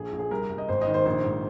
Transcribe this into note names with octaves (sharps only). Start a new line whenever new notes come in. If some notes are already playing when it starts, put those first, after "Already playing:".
Already playing: A#1 G#4
A#1
G#4
C2 A#4
C2
D#5
G#1 C5
D#5
D#3
C5
A#1 C5
G#2